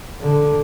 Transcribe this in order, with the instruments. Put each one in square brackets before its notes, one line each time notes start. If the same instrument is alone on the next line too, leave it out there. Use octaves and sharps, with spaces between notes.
[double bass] D3